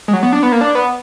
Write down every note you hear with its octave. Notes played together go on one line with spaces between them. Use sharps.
G#3
F#3
B3
D4
B3
A#3
D4
B3